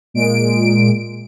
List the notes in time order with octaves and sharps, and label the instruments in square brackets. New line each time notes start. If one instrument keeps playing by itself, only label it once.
[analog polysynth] A#2 G#3 D7